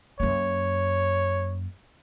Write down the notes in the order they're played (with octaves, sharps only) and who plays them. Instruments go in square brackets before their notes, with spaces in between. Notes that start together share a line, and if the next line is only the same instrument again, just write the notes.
[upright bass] F#2 A#3 [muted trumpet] C#5